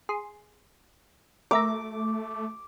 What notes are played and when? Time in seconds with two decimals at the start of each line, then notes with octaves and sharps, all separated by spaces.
0.09 G#4 C6
1.51 A3 A#4 E5 A#5 D6